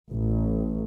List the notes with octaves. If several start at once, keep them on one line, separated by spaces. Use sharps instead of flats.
A1